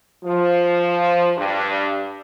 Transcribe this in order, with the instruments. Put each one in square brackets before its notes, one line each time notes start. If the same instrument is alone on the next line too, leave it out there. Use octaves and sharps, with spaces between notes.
[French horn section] F3
G2